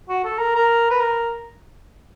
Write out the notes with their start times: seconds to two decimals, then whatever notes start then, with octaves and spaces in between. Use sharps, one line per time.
0.09 F#4
0.25 A4
0.39 A#4
0.55 A#4
0.91 B4
1.00 A#4